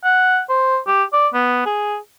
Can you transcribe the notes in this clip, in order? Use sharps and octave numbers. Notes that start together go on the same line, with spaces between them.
F#5
C5
G4
D5
B3
G#4